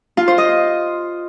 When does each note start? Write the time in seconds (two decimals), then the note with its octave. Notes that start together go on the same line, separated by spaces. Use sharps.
0.17 F4
0.28 C5
0.38 D#5